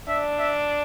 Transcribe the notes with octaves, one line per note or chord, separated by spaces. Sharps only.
D4 E5
E5